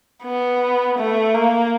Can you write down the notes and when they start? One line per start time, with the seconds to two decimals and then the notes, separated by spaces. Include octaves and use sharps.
0.24 B3
0.98 A3
1.35 A#3